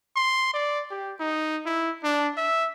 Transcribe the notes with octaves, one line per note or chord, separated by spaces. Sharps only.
C6
D5
G4
D#4
E4
D4
E5